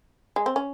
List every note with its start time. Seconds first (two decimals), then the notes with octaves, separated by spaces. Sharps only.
0.36 G#3
0.46 C4
0.56 C#4